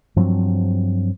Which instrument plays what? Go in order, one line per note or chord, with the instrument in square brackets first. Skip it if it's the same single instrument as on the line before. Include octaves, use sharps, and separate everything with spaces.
[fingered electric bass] G2 F3 F#3 C4